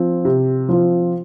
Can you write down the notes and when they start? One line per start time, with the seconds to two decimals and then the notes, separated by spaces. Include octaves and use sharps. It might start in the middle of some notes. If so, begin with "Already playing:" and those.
Already playing: F3 C4 F4
0.25 C3
0.69 F3 C4 F4